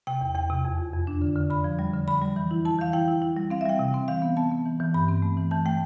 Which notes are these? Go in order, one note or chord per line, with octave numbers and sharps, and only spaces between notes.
C3 G5
E2
E2 G5
C3
F2
F2
F2
D4
D3
D3
D3 B5
F3
G3
D3
D3 B5
G3
E3
E4
E4 A5
E3 F5
E4 G5
E4
E4
G3
C4 F5
E5
G3 G5
C3
C4
E3 F5
B3
B3 A5
B3
E3
E3
G2 B5
C4
A3
E3
E3 A5
A3 G5